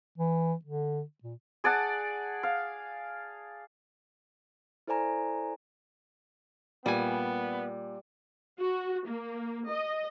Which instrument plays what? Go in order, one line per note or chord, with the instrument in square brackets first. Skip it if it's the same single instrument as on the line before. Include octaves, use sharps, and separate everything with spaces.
[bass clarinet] E3
D3
A#2
[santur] G#4 D5 F#5 A5
F5
[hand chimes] E4 A4 C5 D5 G#5 A#5
[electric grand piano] A#2 [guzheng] G3 G#5 [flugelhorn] B3
[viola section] F#4
A#3
D#5